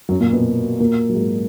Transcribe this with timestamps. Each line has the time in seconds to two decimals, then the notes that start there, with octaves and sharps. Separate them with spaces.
0.09 F#2 F#3
0.20 A#2 A#3
0.33 B2 B3
0.80 A#2 A#3
1.09 F#3
1.15 G#2 G#3